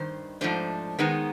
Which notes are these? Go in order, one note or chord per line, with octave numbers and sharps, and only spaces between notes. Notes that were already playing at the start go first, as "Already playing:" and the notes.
Already playing: G2 D#3 C5
G#2 F3 A3 D4 C5
D#3 G#3 B3 D#4